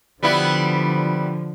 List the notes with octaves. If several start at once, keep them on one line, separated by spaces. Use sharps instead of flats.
D3 F3 G3 B3 E4